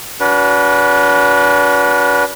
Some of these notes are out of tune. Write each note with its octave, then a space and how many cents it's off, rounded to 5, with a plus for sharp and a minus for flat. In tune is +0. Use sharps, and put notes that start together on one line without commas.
D4 -40 F#4 +0 B4 -20